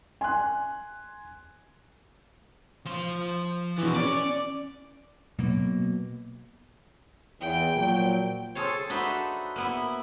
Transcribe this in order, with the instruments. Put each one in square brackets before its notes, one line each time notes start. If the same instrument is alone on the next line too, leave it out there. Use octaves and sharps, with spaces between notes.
[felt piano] G#5 C6 F#6
[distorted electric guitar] F3 C6
[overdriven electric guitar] B2 E3
[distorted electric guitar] C#4 [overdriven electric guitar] D5
[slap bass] B2 F#3 A#3
[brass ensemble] E2 [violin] G5
[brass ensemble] A#2 F3 F#3
[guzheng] F4 G#4 A4 C5 C#5
D4 D#4 F#4 B4 C5 E5
A#3 B3 E4